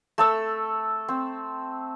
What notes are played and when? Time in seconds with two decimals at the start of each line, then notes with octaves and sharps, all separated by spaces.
0.18 A3 A4 E6
1.08 C4